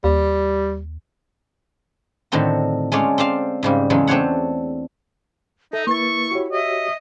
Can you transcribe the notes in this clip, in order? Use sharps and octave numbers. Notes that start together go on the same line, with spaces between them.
D#2 G3
A2 D3 D#3 C4 F#4
G#3 A3 C#4 F4 C#5 D5
C4 C5 D5 F5
G#2 C#3 G3
E2 C#3 F#3 G#3 A4
A3 C4 D4 C5 C#5 F#5
D#4 A4 E5
A#3 E4 B4 C#6 A6
F#4 G4 C#5
D#5 E5